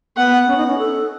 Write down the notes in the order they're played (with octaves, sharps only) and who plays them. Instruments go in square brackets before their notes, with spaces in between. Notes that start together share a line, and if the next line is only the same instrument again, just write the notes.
[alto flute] B3 [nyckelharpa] F#5
[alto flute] C#4
D#4
C#4
A4